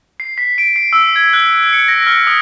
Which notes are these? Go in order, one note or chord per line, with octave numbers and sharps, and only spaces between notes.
C7
B6
D7
C7
E6
G#6
F#6
C#7
A#6
F6
D#6